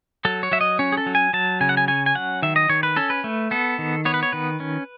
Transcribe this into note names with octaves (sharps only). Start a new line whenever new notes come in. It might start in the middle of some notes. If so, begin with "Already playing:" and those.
F#3 A4
C#5
F#3 E5
D#5
C#4 C#5
G#4
A4
F#3
G#5
F#3 A5
C#3 G#5
F#5
G#5
C#4 G#5
G#5
F#3 F#5
D#3 E5
D#5
D#3 C#5
B4
C#4 A4
B4
A3
B3 A4
D#3
B3 C#5
B4
C#5
D#3 B4
C#4